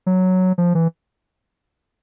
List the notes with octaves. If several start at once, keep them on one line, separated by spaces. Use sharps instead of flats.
F#3
F3
E3